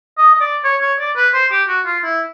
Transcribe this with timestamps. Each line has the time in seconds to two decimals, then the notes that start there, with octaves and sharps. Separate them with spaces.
0.18 D#5
0.34 D#5
0.41 D5
0.64 C#5
0.81 C#5
0.99 D5
1.16 B4
1.33 C5
1.51 G4
1.68 F#4
1.86 F4
2.04 E4